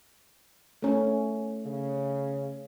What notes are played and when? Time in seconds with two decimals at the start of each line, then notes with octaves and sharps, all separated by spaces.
0.82 A3 C#4
1.65 C#3